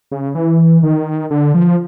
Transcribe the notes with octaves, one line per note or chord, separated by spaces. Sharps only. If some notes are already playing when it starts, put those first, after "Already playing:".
C#3
E3
D#3
D3
F3